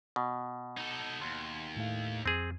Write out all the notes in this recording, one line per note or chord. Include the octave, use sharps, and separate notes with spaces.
B2
D#4 A4
D#2 C6
A2 A3 F5
F2 C4 G#4